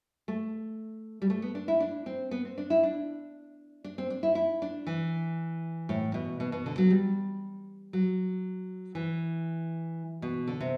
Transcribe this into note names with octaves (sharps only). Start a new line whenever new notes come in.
A3
G3
A3
B3
D4
E4
D4
C4
B3
C4
D4
E4
D4
D4
C4
D4
E4
E4
D4
E3
A2
B2
B2
B2
D3
F#3
G3
F#3
E3
B2
D3
C3